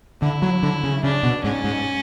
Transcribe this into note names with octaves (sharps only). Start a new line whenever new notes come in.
D3 E4
F#3
D3
C#3
C#3 D4
B2
G#2 C#4
G#2